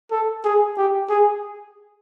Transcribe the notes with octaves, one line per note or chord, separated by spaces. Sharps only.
A4
G#4
G4
G#4